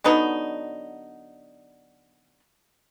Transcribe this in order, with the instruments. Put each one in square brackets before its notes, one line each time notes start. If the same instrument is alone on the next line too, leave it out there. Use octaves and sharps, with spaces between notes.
[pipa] D3 F#3 B3 D#4